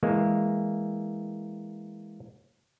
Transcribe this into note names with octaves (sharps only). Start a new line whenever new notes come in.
E3 G#3 A#3